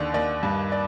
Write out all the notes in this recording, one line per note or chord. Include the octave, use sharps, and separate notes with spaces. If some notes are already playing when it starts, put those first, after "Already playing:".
Already playing: D#2 D3 D5
D#2 D5
G2
D5